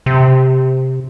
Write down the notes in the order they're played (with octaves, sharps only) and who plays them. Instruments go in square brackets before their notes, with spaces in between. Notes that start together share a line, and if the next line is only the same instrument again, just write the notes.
[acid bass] C3